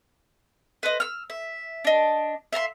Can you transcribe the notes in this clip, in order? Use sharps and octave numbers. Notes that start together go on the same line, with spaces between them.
B4 C5 D#5
E6 F6
E5
D4 D#5
E5 F5 A#5 C6